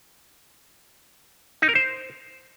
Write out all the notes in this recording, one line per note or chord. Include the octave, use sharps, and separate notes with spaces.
D#4
A#4
C5